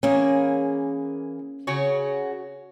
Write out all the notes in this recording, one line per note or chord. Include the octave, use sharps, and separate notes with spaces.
E3 A#3 C#4 G#4
C#3 F#4 C#5